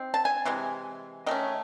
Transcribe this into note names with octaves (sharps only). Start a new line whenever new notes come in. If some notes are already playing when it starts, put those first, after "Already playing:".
Already playing: C4 D#4
A5
G#5
C3 E3 G#3
D#3 A3 C#4 D#5